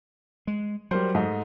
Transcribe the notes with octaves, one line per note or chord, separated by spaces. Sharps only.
G#3
F#3 G3 A#4 C5
G#2 A3 D#5